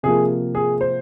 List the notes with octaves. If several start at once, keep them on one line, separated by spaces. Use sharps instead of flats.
C3 F3 A#3 G#4
G#4
C5